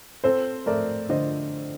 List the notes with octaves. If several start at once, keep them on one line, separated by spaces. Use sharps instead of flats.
C4 A4 C5
A3 A#4 D5
D3 C5 D#5